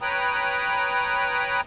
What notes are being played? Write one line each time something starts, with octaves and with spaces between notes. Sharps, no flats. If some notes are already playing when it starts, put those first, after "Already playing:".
B4 C#5 G5 A#5 B5 D#6